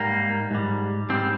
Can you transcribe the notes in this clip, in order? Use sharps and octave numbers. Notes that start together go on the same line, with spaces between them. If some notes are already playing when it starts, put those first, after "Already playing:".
Already playing: G#2 G3 A#3
G#2 G3
G#2 G3 C4